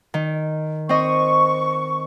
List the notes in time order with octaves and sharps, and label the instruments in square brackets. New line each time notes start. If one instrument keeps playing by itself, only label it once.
[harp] D#3
[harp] C4 D#5 [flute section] C#6